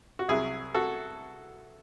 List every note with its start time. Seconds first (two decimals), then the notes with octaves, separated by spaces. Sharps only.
0.19 F#4
0.28 C2 C3 F#3 E4 G#4
0.74 F#4 A4